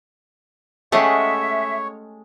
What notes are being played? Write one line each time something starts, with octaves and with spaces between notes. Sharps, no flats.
G#3 A3 C#4 G4 G#4 C#5 E5 F#5